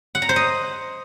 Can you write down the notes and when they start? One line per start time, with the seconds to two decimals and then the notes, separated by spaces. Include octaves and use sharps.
0.15 F#5
0.22 A#5
0.29 C5
0.36 D#5